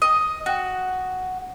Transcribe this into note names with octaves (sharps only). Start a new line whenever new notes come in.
D#5
F#4